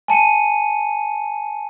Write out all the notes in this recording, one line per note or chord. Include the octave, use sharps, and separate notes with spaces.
G#5 A5 C#7 D#7